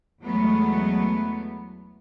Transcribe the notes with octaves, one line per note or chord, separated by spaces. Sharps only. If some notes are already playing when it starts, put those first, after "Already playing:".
E2 F#3 G#3 A3 B3